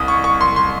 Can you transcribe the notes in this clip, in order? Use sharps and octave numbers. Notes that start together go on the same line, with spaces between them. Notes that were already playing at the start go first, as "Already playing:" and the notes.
Already playing: C2 D#6
C#6
C#6
C6
C6